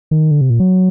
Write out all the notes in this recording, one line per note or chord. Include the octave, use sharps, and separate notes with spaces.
D#3
D3
C3
A#2
F#3